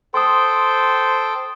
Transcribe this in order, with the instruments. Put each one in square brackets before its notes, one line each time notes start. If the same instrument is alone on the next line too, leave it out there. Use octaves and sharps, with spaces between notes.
[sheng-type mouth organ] A4 C5 G5 [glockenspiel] C6 D#6